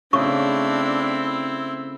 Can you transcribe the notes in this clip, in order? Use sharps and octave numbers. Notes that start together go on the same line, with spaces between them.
C#3 A3 C4 D4 E4 C#6